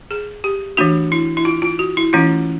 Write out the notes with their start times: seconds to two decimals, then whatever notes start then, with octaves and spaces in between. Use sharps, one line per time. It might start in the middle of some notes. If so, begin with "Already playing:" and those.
0.11 G#4
0.44 G4
0.77 E3 A3 D4 F#4
1.12 E4
1.37 E4
1.45 F4
1.62 F4
1.79 F#4
1.97 E4
2.13 E3 A3 C#4 E4 F4